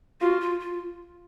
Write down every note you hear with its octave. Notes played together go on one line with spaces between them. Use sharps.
F4 F#4
F4
F4